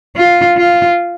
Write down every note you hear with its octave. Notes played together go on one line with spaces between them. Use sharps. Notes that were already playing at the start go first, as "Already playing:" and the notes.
F4
F4